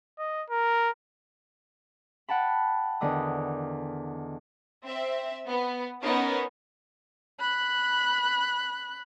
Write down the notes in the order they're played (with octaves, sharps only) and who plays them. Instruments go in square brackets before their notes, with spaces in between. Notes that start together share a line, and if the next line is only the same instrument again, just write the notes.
[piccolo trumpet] D#5
A#4
[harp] F#5 G5 A5 B5
E2 D3 D#3 D#6
[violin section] C4 E5
B3
B3 C#4 D#4 A#4
[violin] B5 F#6